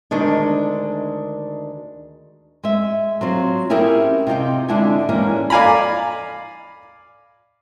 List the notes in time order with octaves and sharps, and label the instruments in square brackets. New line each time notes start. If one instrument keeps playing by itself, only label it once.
[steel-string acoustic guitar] D2 D#3 G#3 D4
[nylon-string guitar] G#3 E5
F#3 C4 F4
C#4 E4 G4 G#4 A#4 C5
C3 D#4 F4 G5
D3 G#3 D4 E4 F#5 G#5
E3 G3 G#3 A#3 C#4
[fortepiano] D5 F5 G#5 A#5 B5